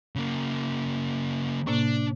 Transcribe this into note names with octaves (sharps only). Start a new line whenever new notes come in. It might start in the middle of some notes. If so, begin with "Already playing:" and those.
C#3 A#3
A2 C3 A#3 D4